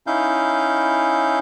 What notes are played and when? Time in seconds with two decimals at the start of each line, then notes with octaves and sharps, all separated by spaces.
0.07 C#4 D#4 E4 F5 G6